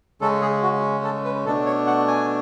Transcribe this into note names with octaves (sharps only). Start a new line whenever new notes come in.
C#3 G#3 C#4 A4
G#4
F#4
A4
B4
B2 A3 D4 A4
C#5
F#5
G#5